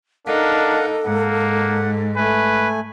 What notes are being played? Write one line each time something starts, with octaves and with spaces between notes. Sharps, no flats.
D4 D#4 A4 A#4 F5 F#5
G#2 A#3 F#5
A3 B4 G#5